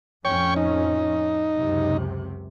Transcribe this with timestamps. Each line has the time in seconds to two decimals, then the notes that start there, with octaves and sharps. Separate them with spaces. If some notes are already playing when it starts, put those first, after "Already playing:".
0.25 F2 A2 C#4 C#5 G5 C#6
0.56 D#4
1.55 C#2 F#2 C3